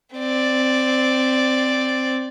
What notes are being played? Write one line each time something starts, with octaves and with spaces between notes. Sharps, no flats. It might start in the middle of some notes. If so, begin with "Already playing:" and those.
C4 D5